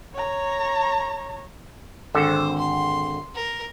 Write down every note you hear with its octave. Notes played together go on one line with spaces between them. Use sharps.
C#5 A#5
G#1 D3 A4 C5
C6
A#4